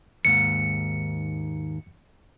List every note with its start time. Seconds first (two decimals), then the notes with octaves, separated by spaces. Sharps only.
0.25 D#2 G#2 C#7